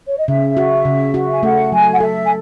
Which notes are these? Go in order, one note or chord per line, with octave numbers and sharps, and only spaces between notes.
C#5
D#5
C#3 E5
F#4
C#3
F#4
G#5
A3 F#5
F#3 G#5
F#5
A4 E5
G#5